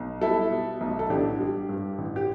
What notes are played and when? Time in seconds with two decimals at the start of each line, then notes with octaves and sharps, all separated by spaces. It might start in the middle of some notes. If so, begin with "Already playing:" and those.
Already playing: B1
0.21 G3 E4 A4
0.51 B2
0.81 B1
0.99 A4
1.09 A1 D4 G4
1.39 G3
1.69 G2
1.98 A1
2.16 G4